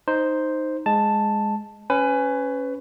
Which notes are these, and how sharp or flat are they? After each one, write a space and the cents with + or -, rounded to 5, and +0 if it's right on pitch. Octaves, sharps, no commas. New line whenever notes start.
D#4 +0 C5 +0
G#3 +0 A5 +0
C#4 +0 B4 +25 G#5 +0